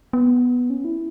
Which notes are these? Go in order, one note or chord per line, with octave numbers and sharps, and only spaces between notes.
B3
C#4
E4